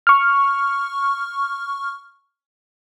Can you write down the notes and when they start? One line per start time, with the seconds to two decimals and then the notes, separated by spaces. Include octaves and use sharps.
0.07 C#6 F6